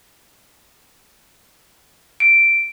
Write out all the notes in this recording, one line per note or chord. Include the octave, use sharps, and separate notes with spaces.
D7